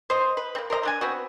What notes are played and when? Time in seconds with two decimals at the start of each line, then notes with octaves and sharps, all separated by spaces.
0.10 C5 D#5
0.37 B4
0.55 A#3 C4
0.70 A#4 C5 D#5 A#5
0.83 A3 D4 G#5
1.01 B3 C4 F#4